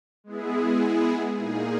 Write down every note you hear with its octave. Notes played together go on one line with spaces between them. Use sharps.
G#3 B3 E4 G#4
A#2 A#3 D#4 G#4